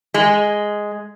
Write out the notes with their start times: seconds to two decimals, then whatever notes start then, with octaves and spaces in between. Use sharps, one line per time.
0.14 G#3